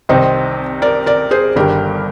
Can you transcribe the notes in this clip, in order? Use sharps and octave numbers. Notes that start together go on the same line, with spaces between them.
C2 C3 D#3 C4 D#4
A#4 D5
A#4 D5
G#4 C5
G1 G2 D#3 G4 A#4